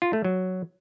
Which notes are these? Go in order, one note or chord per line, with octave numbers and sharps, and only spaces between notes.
F4
A3
F#3